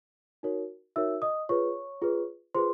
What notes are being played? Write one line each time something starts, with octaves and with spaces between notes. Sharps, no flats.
D#4 F#4 A#4 C#5
D#4 F#4 A#4 C#5 E5 E6
D#5 D#6
F4 G#4 B4 C#5 C#6
F4 G#4 B4
F4 G#4 B4 C5 C6